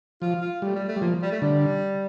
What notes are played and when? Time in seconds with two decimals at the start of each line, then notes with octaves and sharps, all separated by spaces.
0.22 F3 F4
0.42 F4
0.62 G3 A3
0.75 G3
0.88 A3
0.96 G3
1.02 F3 A#3
1.22 G3
1.31 A3
1.42 D3 G3